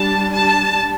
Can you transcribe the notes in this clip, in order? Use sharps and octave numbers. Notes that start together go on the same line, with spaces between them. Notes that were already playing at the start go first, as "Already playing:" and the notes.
Already playing: G3 D4 A5
A5